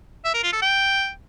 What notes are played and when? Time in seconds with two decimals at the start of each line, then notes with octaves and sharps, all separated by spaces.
0.24 E5
0.34 A#4
0.43 F4
0.53 A4
0.62 G5